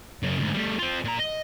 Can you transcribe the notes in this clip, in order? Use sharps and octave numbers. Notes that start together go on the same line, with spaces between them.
F#2 C#3
D2 G#2
G3 A3
C4 F4
A#2 A#5
D#5